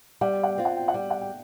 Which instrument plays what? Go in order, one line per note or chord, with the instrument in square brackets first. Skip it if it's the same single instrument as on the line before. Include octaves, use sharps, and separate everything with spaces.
[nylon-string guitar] G3 [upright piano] F#5
[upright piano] G5
F#5
[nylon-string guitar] C4 F4 [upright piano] G5
[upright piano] F#5
G5
F#5
[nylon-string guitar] G3
[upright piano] G5
F#5
G5